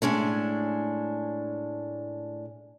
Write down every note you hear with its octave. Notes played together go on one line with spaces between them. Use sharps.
A2 G#3 C#4 D4